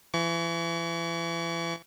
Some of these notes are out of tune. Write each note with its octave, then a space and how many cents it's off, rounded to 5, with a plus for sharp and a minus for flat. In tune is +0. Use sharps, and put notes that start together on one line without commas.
E3 +35 C#6 +45